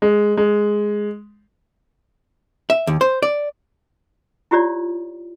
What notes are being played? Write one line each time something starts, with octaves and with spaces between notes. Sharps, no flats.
G#3
G#3
E5
D#2
C5
D5
E4 F4 G4 C#5 D5